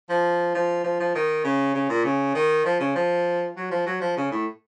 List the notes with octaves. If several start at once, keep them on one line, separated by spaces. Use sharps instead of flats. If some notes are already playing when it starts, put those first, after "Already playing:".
F3
F3
F3
F3
D#3
C#3
C#3
A#2
C#3
D#3
F3
C#3
F3
F#3
F3
F#3
F3
C#3
A2